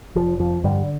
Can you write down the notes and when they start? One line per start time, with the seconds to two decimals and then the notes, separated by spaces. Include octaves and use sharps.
0.15 F1 F3
0.39 F2 F3
0.64 G2 D3 G3